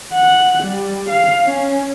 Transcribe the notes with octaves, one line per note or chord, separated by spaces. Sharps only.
F#5
G3
F5
C#4